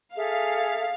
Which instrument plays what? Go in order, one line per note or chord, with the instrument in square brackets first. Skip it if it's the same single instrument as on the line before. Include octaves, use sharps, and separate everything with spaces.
[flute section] G#4 A4 E5 [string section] F5